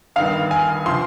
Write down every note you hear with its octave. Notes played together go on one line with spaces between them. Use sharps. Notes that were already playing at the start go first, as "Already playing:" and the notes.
G1 G2 D#3 F5
G#5
C3 F3 C6